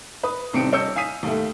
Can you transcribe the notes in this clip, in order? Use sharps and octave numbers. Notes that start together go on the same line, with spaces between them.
B4 D#6
D#1 C2 D#3 C4 C#7 D7
D#1 C#5 D#5 E6 G6 C#7
F5 G#5 D#6 B6 D#7
D#2 A3